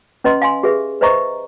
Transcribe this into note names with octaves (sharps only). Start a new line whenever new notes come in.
C#4 B4 D#5 A#5 C6
F5 G#5 C6
G4 G#4 B4 E5
B4 C5 D#5 E5 A#5 C#6